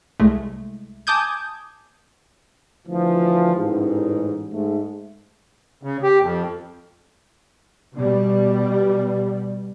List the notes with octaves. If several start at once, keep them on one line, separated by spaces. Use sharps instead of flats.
C2 G#3 A3
G#5 A5 D6 D#6 G6 G#6
D2 E3 F3
A1 G#2
G#2 A3
C#3
G4
F2
B2 G3